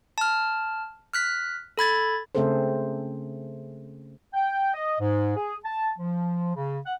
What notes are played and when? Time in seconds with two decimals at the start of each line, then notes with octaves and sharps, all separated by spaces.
0.18 A5 F6
1.14 F6 F#6 B6
1.78 A4 B5 G#6 A6
2.35 C#3 A3 C4 G#4 A4 C5
4.34 G5
4.73 D#5
4.99 G#2
5.35 G#4
5.64 A5
5.97 F3
6.55 C#3
6.84 F#5